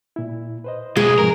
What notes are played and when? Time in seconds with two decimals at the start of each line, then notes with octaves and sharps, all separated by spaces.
0.16 A#2 E4
0.64 B4 C5 D#5
0.97 B1 G#3 G#4
1.18 G#2 C3 F3 A#4